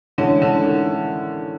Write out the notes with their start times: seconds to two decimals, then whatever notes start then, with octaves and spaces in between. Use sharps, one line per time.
0.18 A2 D3 E3 G#3 C#4
0.42 D3
0.65 D#3